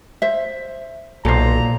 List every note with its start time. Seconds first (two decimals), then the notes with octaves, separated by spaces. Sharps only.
0.22 C5 E5
1.25 B1 A#2 A4 C5 A#5